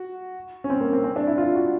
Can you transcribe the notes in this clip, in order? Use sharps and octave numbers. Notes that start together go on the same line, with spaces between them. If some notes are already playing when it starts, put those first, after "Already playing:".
Already playing: F#4
C#4
C4
A#3
C4
C4
D4
E4
F4
F#4